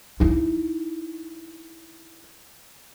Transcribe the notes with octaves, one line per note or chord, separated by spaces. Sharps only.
D#4 E4